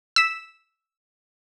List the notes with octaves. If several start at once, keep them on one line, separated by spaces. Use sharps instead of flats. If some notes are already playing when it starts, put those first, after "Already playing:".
E6 B6